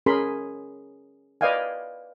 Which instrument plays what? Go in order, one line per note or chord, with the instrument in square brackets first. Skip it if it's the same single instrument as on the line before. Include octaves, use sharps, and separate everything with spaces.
[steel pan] C#4 G#4 A#4 B5 C6
B4 D5 D#5 F5 G5 G#5